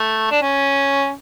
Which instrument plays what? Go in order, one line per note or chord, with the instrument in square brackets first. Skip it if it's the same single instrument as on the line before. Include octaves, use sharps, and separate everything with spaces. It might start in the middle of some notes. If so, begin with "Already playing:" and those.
Already playing: [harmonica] A3
D4
C#4